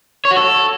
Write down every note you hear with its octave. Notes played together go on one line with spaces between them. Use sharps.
C#5
F#4
A4